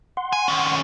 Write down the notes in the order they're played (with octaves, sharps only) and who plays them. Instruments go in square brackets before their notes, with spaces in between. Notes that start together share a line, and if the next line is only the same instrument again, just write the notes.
[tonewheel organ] F#5 C6
[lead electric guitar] G#5
D#3 C#4